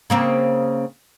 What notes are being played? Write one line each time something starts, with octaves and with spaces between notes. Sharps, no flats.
C#3 A#3 C4